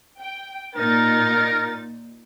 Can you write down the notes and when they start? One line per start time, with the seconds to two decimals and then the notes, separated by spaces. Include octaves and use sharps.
0.20 G5
0.75 A#2 D#4 A#4 A6